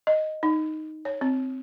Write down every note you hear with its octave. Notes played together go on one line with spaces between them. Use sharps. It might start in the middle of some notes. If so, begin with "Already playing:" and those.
D#5
D#4
C#5
C4